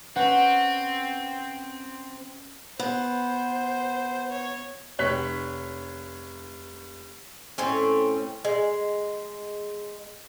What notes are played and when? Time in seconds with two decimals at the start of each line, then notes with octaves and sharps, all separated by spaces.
0.16 C4 C#4 B4 F#5
2.79 B3 C5
4.31 C#5
4.99 F1 C#5 F#6 B6
7.58 A2 C4 C#4
8.45 G#3